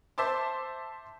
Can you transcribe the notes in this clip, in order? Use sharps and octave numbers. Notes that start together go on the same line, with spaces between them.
C5 E5 A5 C6 D6